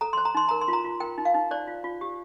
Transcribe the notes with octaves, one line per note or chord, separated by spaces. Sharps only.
A4 A#5
C5 C6
A#5
D#4 C6
A#4 A#5
C6
F4
A#5
F4
A#4 G5
D#4
F5
D#4
C5 D5
F4
F4
G4